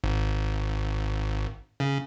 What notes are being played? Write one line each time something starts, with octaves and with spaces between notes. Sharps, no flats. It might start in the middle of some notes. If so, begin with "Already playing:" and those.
G#1
C#3